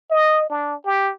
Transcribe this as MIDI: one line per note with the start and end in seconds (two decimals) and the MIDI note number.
0.11 0.46 75
0.50 0.76 62
0.85 1.12 67